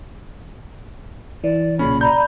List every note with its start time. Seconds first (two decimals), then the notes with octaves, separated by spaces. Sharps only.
1.44 E3 D5
1.79 B1 A#2 C#3 C#4 B5
2.01 D5 A#5 B5 G6